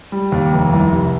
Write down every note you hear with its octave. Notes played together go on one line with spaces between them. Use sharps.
G3
D#2
F1
C2
C3